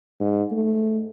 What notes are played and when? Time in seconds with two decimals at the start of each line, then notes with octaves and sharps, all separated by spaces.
0.20 G#2
0.51 A3